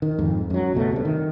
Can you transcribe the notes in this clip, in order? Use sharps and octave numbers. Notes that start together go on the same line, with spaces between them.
D#3
F2 G#2
F#2 F#3
C#2 B2 G3 A3
G2 C3
D#3